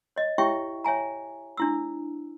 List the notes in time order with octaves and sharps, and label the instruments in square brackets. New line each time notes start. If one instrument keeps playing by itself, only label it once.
[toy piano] C#5 D#5
E4 G4 C#5 E5 G5 C#6
C#5 E5 G#5 A#5
D4 E4 E6